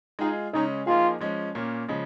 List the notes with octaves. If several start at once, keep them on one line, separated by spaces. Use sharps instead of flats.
G#3 D#4 F4 G#4
C#3 G#3 C#4 D#4
F3 A#3 D#4 F4 G#4
F3 G#3 C#4
A#2 A#3 C#4
C#3 F3 G#3